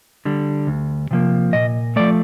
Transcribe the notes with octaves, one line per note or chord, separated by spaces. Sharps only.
D3 G3
D2
C3 F3 A#3
A#2 D#5
F3 A3 D5